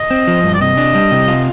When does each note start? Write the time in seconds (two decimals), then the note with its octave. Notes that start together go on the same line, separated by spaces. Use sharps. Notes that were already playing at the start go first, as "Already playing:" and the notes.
Already playing: D#5
0.11 C4
0.27 F3
0.44 G2
0.54 D5
0.61 C3 D#5
0.77 D4
0.95 G3
1.11 C3
1.28 F4